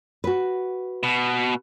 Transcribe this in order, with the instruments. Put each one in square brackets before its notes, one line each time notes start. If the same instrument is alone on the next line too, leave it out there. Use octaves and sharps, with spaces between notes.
[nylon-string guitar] F#4 B4
[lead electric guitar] B2